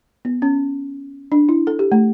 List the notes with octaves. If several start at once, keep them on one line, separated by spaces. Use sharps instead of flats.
B3
C#4
D4
E4
A4
G4
A3